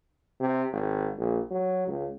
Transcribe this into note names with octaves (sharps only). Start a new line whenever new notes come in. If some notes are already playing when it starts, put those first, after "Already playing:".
C3
G#1
A#1
F#3
C#2